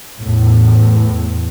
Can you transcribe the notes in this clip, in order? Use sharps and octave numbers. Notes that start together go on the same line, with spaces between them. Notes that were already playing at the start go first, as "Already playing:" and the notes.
E2 A2